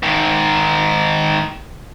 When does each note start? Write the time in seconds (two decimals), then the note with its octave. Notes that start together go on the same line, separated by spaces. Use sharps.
0.03 G#2 D#3